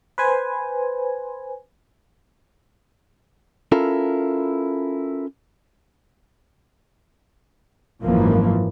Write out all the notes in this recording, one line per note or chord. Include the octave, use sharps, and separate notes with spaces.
B4 C5 G#5
C#4 E4 F4 A4 A#4
G#1 F#2 E3 F3 A#3